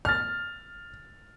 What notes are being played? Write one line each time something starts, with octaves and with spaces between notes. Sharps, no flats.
F6 A6